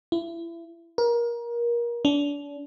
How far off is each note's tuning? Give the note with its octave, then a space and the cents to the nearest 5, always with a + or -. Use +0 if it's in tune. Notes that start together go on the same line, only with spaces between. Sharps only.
E4 +30
A#4 +25
D4 -35